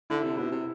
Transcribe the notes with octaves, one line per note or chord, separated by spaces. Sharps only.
D3 E4
C3
B2 E4
C3